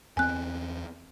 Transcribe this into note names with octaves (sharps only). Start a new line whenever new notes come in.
E2 C4 G#5 F#6